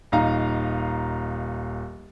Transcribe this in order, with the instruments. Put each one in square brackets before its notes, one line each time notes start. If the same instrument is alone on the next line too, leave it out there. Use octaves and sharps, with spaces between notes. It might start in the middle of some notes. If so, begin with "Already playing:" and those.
[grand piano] D#1 D#4 F5 A#5